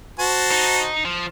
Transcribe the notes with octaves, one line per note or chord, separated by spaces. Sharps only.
F#4 C5 A5
D#4
F3